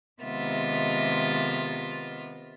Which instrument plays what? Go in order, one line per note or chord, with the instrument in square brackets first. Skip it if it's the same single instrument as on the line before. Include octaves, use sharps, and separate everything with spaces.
[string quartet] C3 D#3 G#3 B3 F4 E5